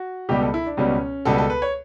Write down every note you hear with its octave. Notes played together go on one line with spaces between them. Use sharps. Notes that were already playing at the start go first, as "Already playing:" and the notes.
Already playing: F#4
C#2 B2 G3 B3 G4
A4
E4
D4
C#2 B2 G3 B3 C#4
C#2 B2 G3 B3 A4
A4
B4
C#5